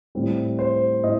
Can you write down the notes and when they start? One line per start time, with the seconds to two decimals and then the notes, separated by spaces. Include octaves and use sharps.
0.15 A2 G3 C4
0.59 C5
1.04 A2 D#5